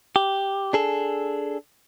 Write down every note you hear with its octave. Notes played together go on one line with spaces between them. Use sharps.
G4
D4 G#4 A4